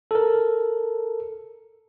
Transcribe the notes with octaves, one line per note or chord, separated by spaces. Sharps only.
A4 A#4